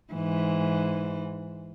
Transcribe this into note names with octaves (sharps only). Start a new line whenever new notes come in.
G#2 E3